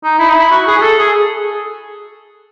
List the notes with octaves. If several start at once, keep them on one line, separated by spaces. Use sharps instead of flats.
D#4
E4
D#4
E4
F#4
G#4
G#4
A4
G#4